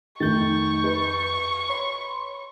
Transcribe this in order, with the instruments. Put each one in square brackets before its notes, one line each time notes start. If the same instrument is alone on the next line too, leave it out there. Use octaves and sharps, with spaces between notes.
[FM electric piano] F2 G6 A6 [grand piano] D#3 A3 [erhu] C#6
[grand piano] B4
[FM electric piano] C#5 B5 C6